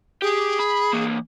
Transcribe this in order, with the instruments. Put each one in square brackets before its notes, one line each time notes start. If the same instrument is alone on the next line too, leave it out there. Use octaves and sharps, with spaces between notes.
[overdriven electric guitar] G4 [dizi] G#4
[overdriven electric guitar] B5
E3 A#3